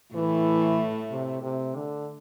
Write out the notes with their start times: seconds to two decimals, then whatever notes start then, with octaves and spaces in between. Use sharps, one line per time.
0.14 A2 E3 A3
1.11 C3
1.43 C3
1.75 D3